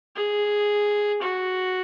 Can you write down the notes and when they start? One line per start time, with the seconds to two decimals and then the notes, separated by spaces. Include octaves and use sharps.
0.16 G#4
1.22 F#4